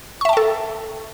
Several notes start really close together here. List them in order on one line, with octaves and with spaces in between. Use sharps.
C#6 E5 A5 G5 A4